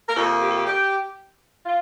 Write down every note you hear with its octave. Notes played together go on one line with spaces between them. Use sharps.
A#4
F2 C3 F3 A#3 A4
G4
A4
G4
G4
F4